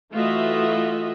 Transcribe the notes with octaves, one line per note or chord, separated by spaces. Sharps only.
E3 A3 F4 F#4 D#5 E5